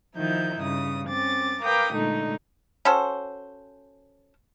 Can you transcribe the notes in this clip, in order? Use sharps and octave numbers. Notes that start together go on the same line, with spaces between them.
D#3 F3 D#4 E4 G6
G2 C#3 D#6
C4 C#4 D6 A6
A#4 B4 F5 G5 D6 D#6
A#2 D3 G#3 A3 D#4
C#4 F#4 A4 C5